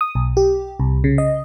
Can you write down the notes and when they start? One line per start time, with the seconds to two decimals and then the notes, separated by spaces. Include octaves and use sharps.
0.01 D#6
0.15 B1
0.37 G4
0.80 C2
1.04 C#3
1.18 D#5